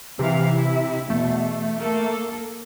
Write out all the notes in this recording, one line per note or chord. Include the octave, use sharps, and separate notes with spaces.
C3 E3 E4 F5
E4
E2 B2 A3
A#3 A4